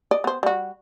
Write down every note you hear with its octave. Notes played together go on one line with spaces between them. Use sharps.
D5 D#5
B3 C5
G3 F#4